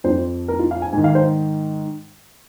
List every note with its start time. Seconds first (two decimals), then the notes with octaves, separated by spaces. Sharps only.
0.04 F2 F3 C5
0.48 A#4
0.59 F4
0.71 F5
0.82 G#5
0.93 G#2 G#5
0.98 D#3
1.04 F5
1.15 C5